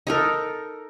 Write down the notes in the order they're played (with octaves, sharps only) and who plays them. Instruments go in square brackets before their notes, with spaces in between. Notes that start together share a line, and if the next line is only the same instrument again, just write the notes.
[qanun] D#4 A4 A#4